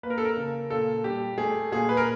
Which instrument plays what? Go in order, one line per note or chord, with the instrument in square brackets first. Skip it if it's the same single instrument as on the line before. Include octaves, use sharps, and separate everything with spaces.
[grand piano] A#3 B4
A#4
A4
A#4
C#3
A#2 A4
G3 G4
A3 G#4
A#2 G#4
B4
A#4